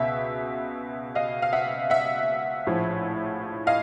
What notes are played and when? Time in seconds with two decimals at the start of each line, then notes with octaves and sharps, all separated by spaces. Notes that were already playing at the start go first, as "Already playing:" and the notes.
Already playing: C#2 B2 E5
1.15 D#5 F5
1.42 F5
1.53 E5 F#5
1.90 E5 F#5
2.67 A#1 A2 F3
3.67 D#5 F5